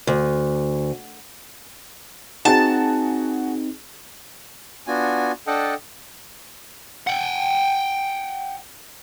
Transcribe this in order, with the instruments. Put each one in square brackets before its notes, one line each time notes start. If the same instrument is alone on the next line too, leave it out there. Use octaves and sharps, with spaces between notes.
[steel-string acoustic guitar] D2
[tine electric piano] C4 D#4 [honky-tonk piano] F#4 G#4 A6 [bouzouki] A5
[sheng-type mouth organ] B3 D4 F4 F#4 G#5
D4 A4 D#5 F#5 G5 A5
[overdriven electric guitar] F#5 G5